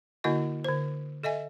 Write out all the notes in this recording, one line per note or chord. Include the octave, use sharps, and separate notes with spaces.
D3 A#3 E4 F#4 D#5 G#5
D3 C5
A4 D#5 E5 G#5